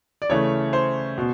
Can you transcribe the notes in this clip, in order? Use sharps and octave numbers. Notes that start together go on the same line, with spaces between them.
D5
C#3 E3 A3 C#4 C#5
C5
B2